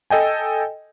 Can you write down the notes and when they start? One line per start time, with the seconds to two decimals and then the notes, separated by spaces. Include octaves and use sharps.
0.10 A4 D#5 G5 G#5